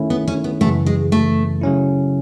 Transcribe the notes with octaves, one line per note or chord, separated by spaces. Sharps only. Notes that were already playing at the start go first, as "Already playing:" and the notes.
Already playing: D#3 A3 C#4 E4
B3
C#4
B3
F#2 C#3 E3 A3
G#3
A3
C#3 F#3 C#4 E4